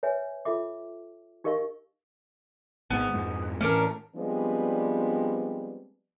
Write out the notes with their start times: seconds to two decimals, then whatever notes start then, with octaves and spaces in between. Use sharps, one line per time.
0.03 B4 C#5 E5 G#5
0.45 F4 A4 E5 D6
1.44 D#4 G4 A#4 D#5 F5 C#6
2.90 G#1 G#2 B3
3.14 F2 G#2
3.61 A2 E3 A3 C#4 D4 A#4
4.16 F3 G3 G#3 B3 C4 D4